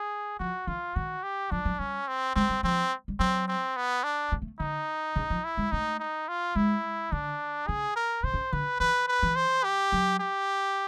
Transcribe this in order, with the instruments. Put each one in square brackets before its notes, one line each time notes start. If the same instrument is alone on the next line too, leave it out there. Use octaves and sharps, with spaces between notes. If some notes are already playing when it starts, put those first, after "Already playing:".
Already playing: [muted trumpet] G#4
[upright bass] F3 [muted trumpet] F#4
[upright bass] E3 [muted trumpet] F4
[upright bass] D#3 [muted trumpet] F#4
[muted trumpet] G4
[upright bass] F3 [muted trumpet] D4
[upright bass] F#3
[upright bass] G3 [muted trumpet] C#4
[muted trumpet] C4
[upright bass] G#3 [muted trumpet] C4
[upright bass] G3
[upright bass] F3 [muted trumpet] C4
[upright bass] G3
[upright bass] F#3 [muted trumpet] C4
[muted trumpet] C4
B3
D4
[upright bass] A#3
A3
[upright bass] D3 [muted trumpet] D#4
[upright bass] C#3
F3
[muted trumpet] E4
[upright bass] G#3
[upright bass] A3 [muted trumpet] D#4
[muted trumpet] D#4
F4
[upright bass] G#3 [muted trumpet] E4
[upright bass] D3 [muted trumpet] D4
[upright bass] C#3 [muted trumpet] G#4
[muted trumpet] A#4
[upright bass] C3 [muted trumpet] C5
[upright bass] C#3
[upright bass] D3 [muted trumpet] B4
[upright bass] E3 [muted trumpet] B4
[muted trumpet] B4
[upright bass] E3
[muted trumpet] C5
G4
[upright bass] F#3
[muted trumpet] G4